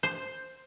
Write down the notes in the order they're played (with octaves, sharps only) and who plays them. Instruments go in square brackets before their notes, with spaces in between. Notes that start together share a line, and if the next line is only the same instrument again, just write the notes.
[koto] C5